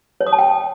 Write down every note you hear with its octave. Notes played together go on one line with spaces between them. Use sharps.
C#5
D#6
A5
G5